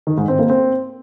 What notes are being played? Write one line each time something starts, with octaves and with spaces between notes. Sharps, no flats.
D#3
G#2
C4
A#3
C4